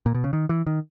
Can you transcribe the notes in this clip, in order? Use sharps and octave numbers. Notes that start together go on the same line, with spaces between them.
A#2
B2
C#3
D#3
E3
D#3